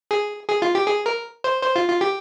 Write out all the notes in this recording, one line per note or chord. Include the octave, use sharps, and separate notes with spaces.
G#4
G#4
F4
G4
G#4
A#4
C5
C5
F4
F4
G4